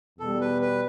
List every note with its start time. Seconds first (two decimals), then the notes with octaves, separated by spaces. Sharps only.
0.19 E2 B2 G3 A4
0.41 B4
0.62 B4